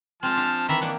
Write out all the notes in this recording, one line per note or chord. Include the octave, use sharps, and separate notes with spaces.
F3 G#3 C4 A5 F6
D4
D#3 E3 E5 A#5 B5
A#3 D4 D#4 F#5